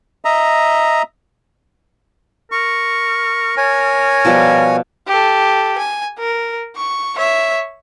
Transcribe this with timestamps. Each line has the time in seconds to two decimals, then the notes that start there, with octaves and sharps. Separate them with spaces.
0.25 D#5 E5 A#5
2.52 A#4 C#6
3.57 C#5 G#5
4.25 B2 F3 G3
5.07 G4 A4
5.78 G#5
6.18 A#4
6.77 C#6
7.15 C#5 E5